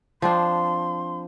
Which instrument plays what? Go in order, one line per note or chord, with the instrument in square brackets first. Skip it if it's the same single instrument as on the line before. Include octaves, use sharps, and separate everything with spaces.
[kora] F3 C4 D4 [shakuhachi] C6